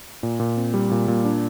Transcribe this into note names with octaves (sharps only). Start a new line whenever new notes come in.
A#2
A#2
C4
G3
A#2
A#2
D4